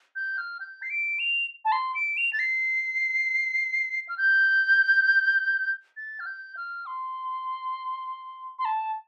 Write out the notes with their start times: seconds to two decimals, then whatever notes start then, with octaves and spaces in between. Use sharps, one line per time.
0.16 G6
0.38 F6
0.60 G6
0.82 C7
0.90 D7
1.19 F7
1.65 A5
1.72 C6
1.95 D7
2.17 F7
2.33 A6
2.39 C7
4.09 F6
4.18 G6
5.97 A6
6.20 F6
6.26 G6
6.57 F6
6.86 C6
8.59 C6
8.65 A5